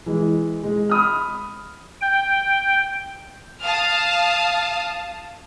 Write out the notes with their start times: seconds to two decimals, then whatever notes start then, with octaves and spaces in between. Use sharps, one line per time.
0.06 E3 G#3
0.64 G#3
0.90 B5 D#6 F6
2.01 G5
3.63 F5 A5 D#6 F6